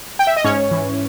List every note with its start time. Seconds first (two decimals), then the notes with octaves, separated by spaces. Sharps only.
0.19 G5
0.27 E5
0.36 D#5
0.44 G#2 C#4 C#5
0.71 E3